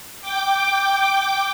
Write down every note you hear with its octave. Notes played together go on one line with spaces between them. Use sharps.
G5 D6